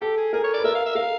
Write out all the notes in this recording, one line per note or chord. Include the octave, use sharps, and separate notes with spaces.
G4 A4
G#4
G#4 A#4
C#5
D5
B4
A#4 E5
F5
E5
A#4 F5